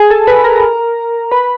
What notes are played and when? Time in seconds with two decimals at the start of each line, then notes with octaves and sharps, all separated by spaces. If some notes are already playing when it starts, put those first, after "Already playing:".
Already playing: G#4 G#5
0.10 A4 A5
0.27 B4 B5
0.44 A#4 A#5
1.31 B4 B5